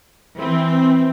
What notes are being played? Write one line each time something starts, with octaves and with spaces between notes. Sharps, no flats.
E3 C4